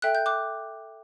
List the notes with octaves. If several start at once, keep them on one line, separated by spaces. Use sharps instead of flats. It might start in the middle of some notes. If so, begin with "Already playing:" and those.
A4 E5 G5 F#6
G6
D6 F#6